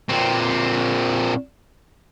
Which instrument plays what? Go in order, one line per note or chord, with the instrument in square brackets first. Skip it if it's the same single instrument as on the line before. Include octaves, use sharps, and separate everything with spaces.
[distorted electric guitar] A#2 C4